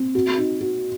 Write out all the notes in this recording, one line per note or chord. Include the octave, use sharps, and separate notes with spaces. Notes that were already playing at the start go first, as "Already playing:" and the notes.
Already playing: C4
F#4
D#4
F#4